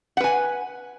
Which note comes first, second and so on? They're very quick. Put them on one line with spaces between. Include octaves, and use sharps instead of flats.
F#5 B4 G#5